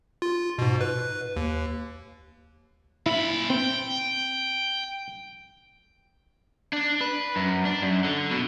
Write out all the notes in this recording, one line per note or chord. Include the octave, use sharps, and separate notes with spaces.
F4
G#2 B2
B4
D#2
A#2 E4 B5
C4 G5
D4
B4
F#2
D4
F#2
D3
B2